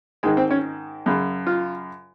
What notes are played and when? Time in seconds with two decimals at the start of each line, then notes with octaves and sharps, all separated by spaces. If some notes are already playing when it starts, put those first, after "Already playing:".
0.23 G#2 D#3 G#3
0.37 C4
0.51 C#4
1.06 F#2 C#3
1.47 F4